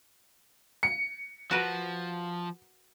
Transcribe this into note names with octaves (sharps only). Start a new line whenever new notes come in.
C#7
F3 F#4 A#4 B4